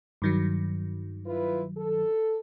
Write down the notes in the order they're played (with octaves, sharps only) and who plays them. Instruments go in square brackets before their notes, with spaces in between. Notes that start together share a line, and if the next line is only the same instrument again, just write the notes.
[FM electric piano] G2 D#3 F#3
[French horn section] E4 F4 B4
A4